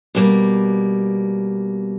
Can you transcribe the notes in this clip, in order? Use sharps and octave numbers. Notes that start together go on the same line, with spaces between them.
B2 G3 A#3